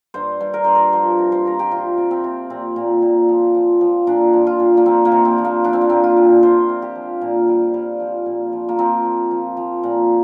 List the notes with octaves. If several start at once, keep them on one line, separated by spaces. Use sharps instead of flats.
G2 C5
G2
A#4
G2 C5
A#4
F3 C5
C3
C5
F3 A#4
G4
C3 F4
C3
C4
C3
A#2 C4
A#2
A#2
F3
F3
F3
A#2 D4
F3
F4
A#2
A#3
F3 C4
A#3
C3
C4
F3
A#3
F3 D4
C4
A#3
A#2 C4
F4
A#2
C3 C5
C3
G4
F3
A#2
G3
G3
F3
A#2
F3
A#3
F3 C4
F3
F3
F3
A#2